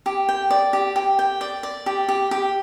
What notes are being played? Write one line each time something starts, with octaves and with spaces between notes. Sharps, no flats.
G4
G5
D5
G4
G4
G5
D5
D5
G4
G4
G4